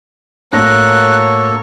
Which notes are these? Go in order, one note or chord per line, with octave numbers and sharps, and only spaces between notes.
A2 A#3 D4 F#4 A4 C#5 F#6 A#6